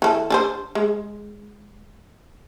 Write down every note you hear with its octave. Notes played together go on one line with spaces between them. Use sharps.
E3 A4
D4 A4 C5
G#3